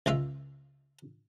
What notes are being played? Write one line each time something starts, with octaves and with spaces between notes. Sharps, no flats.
C#2 G#3 F4 E5